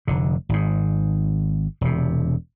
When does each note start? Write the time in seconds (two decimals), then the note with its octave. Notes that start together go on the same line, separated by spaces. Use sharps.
0.07 F1 D3
0.49 G#1 G#2
1.81 E1 C3